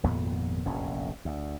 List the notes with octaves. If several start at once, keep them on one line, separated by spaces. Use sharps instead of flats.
G#1 F2 A#2 B3
F1 A#1 E2 C#4
D2